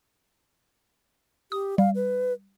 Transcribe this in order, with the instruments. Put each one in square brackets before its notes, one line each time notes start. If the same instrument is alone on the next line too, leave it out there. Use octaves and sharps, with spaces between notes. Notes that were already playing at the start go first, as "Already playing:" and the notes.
[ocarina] G4 [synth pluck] D#6
[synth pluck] G3 [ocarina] F5
[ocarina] B4